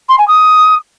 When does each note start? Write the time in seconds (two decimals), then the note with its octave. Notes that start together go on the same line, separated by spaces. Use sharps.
0.08 C6
0.18 G#5
0.28 D#6